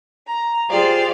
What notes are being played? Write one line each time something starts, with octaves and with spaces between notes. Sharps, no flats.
A#5
F4 G4 G#4 C5 D5 F5